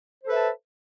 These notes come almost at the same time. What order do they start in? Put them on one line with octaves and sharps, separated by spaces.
C5 A4 B4 E5 A5